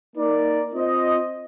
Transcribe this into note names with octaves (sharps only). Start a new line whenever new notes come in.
A#3 D#4 A#4 D5
C4 F4 C5 D#5